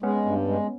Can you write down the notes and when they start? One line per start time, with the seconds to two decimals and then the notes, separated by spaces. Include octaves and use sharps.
0.02 G#3 B3 C#4
0.25 G2
0.48 G#3